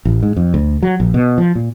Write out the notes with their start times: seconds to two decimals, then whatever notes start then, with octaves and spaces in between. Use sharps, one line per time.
0.05 A1
0.23 G#2
0.36 F2
0.54 D2
0.83 F#3
1.00 A#1
1.14 B2
1.38 F3
1.55 A#2